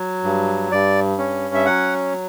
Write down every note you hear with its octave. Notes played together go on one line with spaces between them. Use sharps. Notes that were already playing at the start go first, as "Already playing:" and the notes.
Already playing: F#3
G2
G2 D5
C#4
E5
F#3 F#5